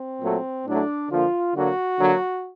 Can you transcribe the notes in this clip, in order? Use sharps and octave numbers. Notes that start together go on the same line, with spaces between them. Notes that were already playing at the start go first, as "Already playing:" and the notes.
Already playing: C4
A#2 F#3 A3
A2 F#3 A3 D4
D3 F3 A#3 F4
D3 F#3 A#3 F#4
D3 F#3 A#3